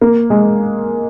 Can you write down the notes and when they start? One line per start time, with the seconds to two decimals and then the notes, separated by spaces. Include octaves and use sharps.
0.01 A#3
0.30 G#3